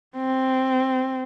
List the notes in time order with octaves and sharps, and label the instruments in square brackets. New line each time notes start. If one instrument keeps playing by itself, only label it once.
[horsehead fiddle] C4